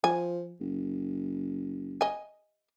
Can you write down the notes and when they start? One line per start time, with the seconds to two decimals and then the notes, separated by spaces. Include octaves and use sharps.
0.04 F3 G#5
0.60 F#1
2.01 D#5 G#5